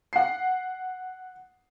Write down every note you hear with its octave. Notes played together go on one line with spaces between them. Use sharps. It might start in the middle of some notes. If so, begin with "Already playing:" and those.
F#5 C7